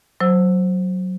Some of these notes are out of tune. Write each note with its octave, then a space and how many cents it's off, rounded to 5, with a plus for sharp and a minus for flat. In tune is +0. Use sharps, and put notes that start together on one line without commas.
F#3 +0 C5 +0 E6 +0